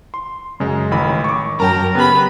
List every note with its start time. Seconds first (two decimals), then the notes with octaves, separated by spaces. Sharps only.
0.14 C6
0.60 F#2 C#3 G#3
0.91 A1 D#3 B5
1.24 C#6 D6
1.60 F#2 F#3 A#4 G5 A5 A#5
1.95 C#3 B3 G4 B4 B5